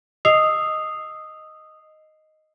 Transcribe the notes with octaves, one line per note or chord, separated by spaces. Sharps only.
D#5 D#6 E6 C7 F7